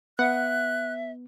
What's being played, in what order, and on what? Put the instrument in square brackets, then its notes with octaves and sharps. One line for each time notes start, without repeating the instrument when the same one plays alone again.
[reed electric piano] B3 [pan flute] E5 [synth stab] F#5 [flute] F#6